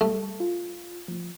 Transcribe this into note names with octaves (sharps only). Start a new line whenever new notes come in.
G3 A3
F4
F3